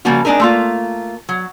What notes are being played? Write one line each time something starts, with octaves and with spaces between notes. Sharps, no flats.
C#3 F3 G3 A#3 F4 F#4
G#3 C4 D4 D#4 A#4
A3 A#3 F4
F#3